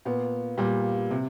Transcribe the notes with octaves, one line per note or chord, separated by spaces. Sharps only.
A#2 B3
A#2 G3
C3